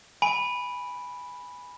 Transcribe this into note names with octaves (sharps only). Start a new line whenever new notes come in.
G#5 B5 D7